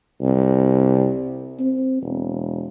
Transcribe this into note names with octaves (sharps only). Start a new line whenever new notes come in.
C2
C4
E1